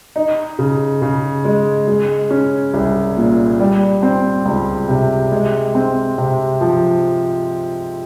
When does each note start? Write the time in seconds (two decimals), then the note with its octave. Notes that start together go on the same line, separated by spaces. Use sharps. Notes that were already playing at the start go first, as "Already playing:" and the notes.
0.16 D#4
0.59 C#3
1.02 C#3
1.45 G#3
1.88 G#3
2.31 C#4
2.74 C2
3.17 A#2
3.60 G3
4.03 C4
4.46 C#2
4.89 C3
5.32 G#3
5.75 C4
6.18 C3
6.61 F3